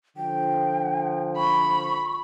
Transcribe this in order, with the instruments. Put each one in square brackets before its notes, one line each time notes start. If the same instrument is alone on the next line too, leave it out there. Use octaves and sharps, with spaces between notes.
[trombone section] D3 F3 [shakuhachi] G5
[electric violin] B5 [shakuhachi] C#6